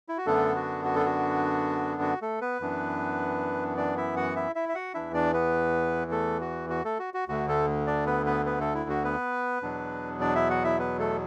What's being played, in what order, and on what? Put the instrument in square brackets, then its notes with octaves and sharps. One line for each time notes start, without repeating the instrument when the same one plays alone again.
[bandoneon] E4
F#4
F#2 D3 A3 B3 D4 A4
F#4
F#4
A4
F#4
F#4
A3 A4
B3 B4
F#2 E3 B3 D4
D4 D5
E4 E5
F#4 F#5
E4 E5
E4 E5
E5
F#4 F#5
E2 E3 D4 E4 E5
D4 D5
B3 B4
A3 A4
F#4
F#4
A3 A4
F#4
F#4
D2 D3 A3 F#4
A3 A4
D4 D5
B3 B4
B3 B4
B3 B4
A3 A4
E4
F#4
B3 B4
E2 B2 F#3 B3 D4
D4 D5
E4 E5
F#4 F#5
E4 E5
B3 B4
A3 A4